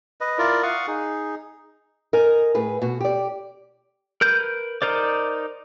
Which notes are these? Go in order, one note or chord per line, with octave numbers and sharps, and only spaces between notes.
B4 D#5
E4 F4 A#4 D5
F5 F#5 C#6 D#6
D#4 G#4
A#4 D#5 G#5
A2 G#4 B4
B2 F#4
G4 D5
A#4 B4 G6
D#4 A#4 C5 D5